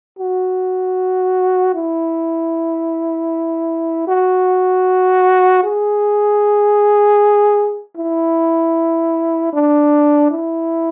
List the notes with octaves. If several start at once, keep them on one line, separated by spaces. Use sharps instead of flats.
F#4
E4
F#4
G#4
E4
D4
E4